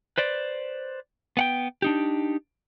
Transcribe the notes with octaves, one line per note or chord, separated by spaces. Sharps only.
B4 C5 D5
B3 F#5 G5
D4 D#4 G4